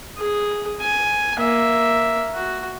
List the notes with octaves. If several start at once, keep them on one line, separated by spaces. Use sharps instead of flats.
G#4
G#5
A#3 E5
F#4